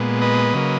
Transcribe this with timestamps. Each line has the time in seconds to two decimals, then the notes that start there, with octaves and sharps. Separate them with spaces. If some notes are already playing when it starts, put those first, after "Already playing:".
Already playing: A#2 G#3 B3
0.21 B4 D#5
0.54 C#3 F#3 A#3